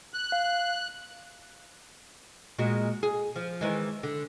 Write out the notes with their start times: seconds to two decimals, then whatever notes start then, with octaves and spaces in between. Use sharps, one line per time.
0.14 F#6
0.32 F5
2.59 A#2 G#3 F#4
3.03 G#4
3.36 F3
3.61 D#3 E3 G#3
4.03 D3